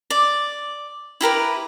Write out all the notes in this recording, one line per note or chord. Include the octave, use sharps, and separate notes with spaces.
D5
E4 G4 A#4 B4